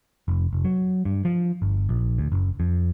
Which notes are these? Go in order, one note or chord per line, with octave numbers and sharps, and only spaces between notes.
F1
F1
F#3
G2
F3
G1
A#1
D2
F#1
F2